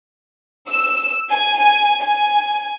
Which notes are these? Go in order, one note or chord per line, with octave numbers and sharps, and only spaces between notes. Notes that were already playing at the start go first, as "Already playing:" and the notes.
E6
G#5
G#5
G#5